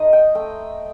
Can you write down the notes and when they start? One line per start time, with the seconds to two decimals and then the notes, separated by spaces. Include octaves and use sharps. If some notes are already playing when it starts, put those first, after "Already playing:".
Already playing: A3 D#4 C5 D#5
0.13 G5
0.35 A3 G5